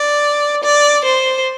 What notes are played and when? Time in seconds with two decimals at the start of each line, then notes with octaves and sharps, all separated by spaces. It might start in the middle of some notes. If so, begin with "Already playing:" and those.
Already playing: D5
0.63 D5
1.05 C5